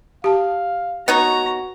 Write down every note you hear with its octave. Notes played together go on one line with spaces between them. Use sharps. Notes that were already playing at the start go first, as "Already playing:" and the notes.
G4 F5 A5
B3 D#4 F#4 C#5 A#5